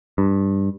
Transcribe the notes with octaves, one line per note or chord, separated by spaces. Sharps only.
G2